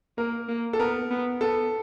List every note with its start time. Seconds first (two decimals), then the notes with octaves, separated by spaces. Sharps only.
0.18 A#3 A#4
0.48 A#3
0.73 A4
0.80 B3 A#4
1.11 B3
1.41 B3 A4